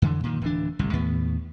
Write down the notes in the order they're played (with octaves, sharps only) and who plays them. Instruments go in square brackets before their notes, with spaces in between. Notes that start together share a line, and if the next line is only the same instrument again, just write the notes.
[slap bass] F2 D3 E3
A#2 D#3
D1 E3 D4
G1 C2 A2
D#2 A2 B3